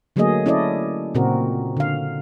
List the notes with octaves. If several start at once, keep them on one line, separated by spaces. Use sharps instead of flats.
D3 F#3 A3 A#3 G#4 D#5
C#4 E4 A4 D5 D#5
A#2 C#3 C4 F#4 A#4
D3 F5